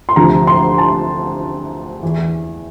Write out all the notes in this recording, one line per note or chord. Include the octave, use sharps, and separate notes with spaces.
C6
D2 C3 F3 A#5
C6
A5
E2 E3